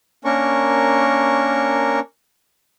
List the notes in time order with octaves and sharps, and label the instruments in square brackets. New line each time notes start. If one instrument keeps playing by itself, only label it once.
[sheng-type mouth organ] A#3 C#4 D4 A#4 C#6